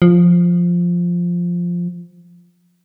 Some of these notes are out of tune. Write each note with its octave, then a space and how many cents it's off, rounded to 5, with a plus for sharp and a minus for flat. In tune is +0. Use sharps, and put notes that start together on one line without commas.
F3 +0